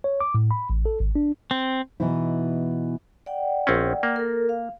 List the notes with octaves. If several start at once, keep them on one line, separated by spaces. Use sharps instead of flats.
C#5
D6
A2
B5
A1
A4
G#1
D4
C4
B2 E3 B3 D#4 E4
D5 F#5 G5
A#1 C4 C#4
A#3
A4 A#4
F5